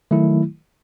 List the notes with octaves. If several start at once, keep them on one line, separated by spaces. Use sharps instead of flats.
D#3 F#3 A3 E4